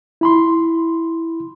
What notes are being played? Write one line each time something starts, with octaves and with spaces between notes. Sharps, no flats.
E4 B5 C6